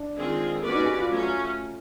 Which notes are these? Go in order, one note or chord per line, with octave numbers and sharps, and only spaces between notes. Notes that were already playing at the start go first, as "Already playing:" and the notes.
Already playing: D4
D#3 G#3 C4 F4 G#4
A#3 C#4 F#4 B4 D5
D#4
G#4
G4
F4
F#3 A3 C#4